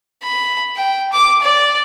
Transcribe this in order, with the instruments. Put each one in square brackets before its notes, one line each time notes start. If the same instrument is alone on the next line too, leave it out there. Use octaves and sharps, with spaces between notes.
[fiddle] B5
G5
D6
D5